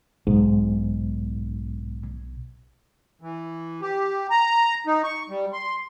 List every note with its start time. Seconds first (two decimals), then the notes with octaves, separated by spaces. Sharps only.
0.27 B1 G#2
3.21 E3
3.81 G4
4.30 A#5
4.87 D#4
5.04 C#6
5.29 G3
5.53 C6